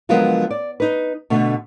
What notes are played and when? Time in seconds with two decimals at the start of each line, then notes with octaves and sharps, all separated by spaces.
0.09 D3 F3 F#3 G#3 B3 A#4
0.50 D5
0.80 D#4 B4
1.30 B2 D3 A3